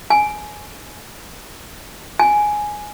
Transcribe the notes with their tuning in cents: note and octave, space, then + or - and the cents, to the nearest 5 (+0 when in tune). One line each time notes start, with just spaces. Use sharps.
G#5 +15
G#5 +5